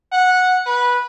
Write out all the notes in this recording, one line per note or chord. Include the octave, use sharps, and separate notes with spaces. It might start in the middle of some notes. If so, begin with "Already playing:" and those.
F#5
B4